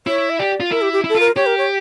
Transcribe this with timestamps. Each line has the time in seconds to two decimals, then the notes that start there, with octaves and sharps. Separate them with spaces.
0.07 E4 C#5
0.30 E5
0.39 G4 D5
0.60 F4
0.71 E4 A#4
0.82 G4
0.93 G4
1.04 E4
1.09 A4
1.15 F4
1.20 A#4
1.36 G4 C#5
1.46 A#4
1.58 C#5